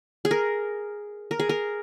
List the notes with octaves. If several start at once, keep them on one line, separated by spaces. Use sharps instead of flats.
G#4
A#4
A#4
G#4
A#4